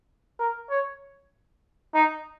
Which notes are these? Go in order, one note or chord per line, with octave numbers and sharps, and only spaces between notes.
A#4
C#5
D#4